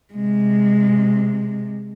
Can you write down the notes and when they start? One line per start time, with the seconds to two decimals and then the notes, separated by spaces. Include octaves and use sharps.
0.14 C3 G#3